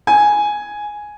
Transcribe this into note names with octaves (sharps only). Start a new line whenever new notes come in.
G#5